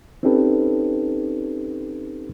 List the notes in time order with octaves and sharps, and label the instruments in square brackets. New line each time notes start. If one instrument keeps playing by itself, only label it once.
[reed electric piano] C4 C#4 D#4 G4 A4 B4